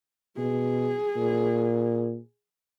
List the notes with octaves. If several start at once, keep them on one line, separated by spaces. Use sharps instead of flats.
B2 G#4
A#2